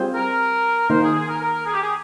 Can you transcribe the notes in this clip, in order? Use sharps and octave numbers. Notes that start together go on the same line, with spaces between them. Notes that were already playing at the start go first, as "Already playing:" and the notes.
Already playing: G3 C4 F4 G#4 C5
A#4
D#3 A#3 D#4 C5
G#4
G#4
A#4
A#4
G#4
G4
G#4